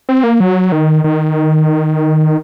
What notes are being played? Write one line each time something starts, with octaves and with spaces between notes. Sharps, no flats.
C4
A#3
F#3
D#3
D#3